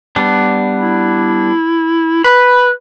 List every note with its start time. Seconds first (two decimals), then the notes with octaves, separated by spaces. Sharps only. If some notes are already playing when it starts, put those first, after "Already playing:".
0.16 G3 B3 D4
0.80 E4
2.24 B4 B5